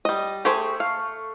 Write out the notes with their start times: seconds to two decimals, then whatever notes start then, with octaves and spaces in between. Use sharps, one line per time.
0.05 G3 D#5
0.45 A3 G4 G#4 C5
0.80 F5